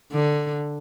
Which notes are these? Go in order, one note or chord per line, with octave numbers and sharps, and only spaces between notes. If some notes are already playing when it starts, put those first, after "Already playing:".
D3